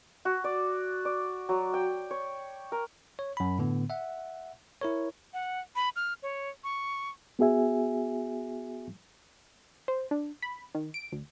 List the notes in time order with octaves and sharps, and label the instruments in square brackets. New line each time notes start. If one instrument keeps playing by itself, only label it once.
[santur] F#4
D5
D5
F#3
G5
C#5
A#4
[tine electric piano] C#5
F#2 B5
A2 D3 B3
E5 F#5
E4 A#4 C#5
[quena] F#5
B5
F6
C#5
C#6
[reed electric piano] B3 F#4 G#4 E5 G#5
[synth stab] C5
D4
B5
D#3
D7
D2